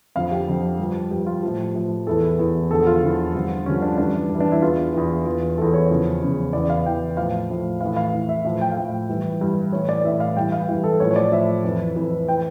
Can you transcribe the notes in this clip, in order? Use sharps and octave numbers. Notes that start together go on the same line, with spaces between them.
F2 D3 F3 F5
G4
F2 D3 F3
G2 F3
G2 F3 G4
F4
A2 F3
A2 F3
E2 E3 A4
E2 E3
E2 D3 F3 A4
F4
E2 D3 F3
G2 D3 F3
G2 D3 F3 C#4
D4
G2 E3 D4
G2 E3
D4
E4
E2 E3 F4
E2 E3
E2 E3 F4
E2 E3 A4
C#5
E2 C#3 F3
E2 C#3 F3
E2 E3 D5
F5
E2 E3 G5
A2 F3 F5
A2 F3
A2 E3 F5
F5
A2 E3
E5
A2 F3 E5
G5
F5
A2 F3 G5
G2 E3
G2 E3
A2 E3 C#5
D5
A2 E3 E5
F5
G2 E3 G5
F5
G2 E3
A4
A2 F3 C#5
C#5
D5
A2 F3 E5
F2 E3
F2 E3
E3 G5